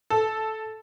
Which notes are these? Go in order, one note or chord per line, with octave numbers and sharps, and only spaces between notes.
A4